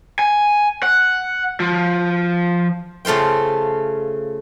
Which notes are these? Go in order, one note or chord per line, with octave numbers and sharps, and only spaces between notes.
G#5
F#5
F3
C#3 A3 F4 C5 G5